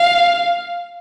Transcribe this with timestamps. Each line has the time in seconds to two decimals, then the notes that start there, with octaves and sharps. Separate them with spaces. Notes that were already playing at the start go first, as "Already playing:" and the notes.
Already playing: F5